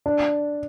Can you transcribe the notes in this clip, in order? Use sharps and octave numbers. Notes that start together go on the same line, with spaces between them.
D4